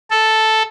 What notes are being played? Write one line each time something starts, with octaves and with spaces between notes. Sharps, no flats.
A4